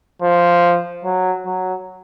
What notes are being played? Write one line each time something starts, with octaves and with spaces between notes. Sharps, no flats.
F3
F#3
F#3